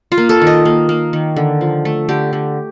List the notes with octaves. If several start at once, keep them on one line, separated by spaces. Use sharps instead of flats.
F4
A#3
A4
D#3
D#5
A#3
A#3
D#3
D3
F3
A3
D3 G4
D3